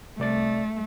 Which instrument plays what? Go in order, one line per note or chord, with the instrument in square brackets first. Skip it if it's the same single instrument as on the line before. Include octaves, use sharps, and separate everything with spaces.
[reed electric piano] C2 D5 A6 [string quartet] A3